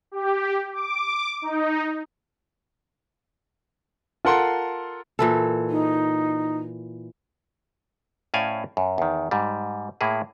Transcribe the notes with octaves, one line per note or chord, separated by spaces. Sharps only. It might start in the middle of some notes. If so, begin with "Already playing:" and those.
G4
D6
D#4
F4 A4 A#4 F#5 C6
A#2 E3 A4
D#4
A2 C#4 C5 D5 F5 G#5
F#2
E2 D#3
G#2 G3
A2 A#3 E4 G#4